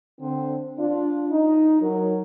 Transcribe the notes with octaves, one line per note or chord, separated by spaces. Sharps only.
D3 C4
D4 F4
D#4
F#3 A#4